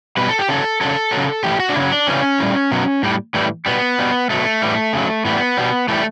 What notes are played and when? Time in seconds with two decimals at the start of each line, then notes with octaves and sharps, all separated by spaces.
0.17 B2 G3 B4
0.28 A4
0.39 G4
0.49 C#3 F#3 A4
0.81 C#3 F#3 A4
1.12 C#3 F#3
1.44 A2 E3 G3 G4
1.60 F#4
1.69 D4
1.76 C#3 F#3 E4
1.92 D4
2.08 C#3 E3 G3 C#4
2.40 A2 G3
2.71 B2 F#3
3.03 A2 G3
3.34 A2 E3 G3
3.66 B2 G3 B3
3.99 B2 G3
4.30 B2 F#3 A3
4.62 A2 E3 G3
4.93 C#3 F#3
5.25 A2 E3 G3 B3
5.57 B2 G3
5.88 A2 E3 G3 A3